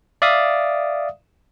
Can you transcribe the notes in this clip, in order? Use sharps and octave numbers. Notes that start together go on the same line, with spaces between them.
D5 E5 F5 D#6